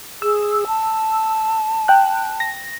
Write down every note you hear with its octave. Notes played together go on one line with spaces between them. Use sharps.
G#4 E6
A5
G5 F#6
A#6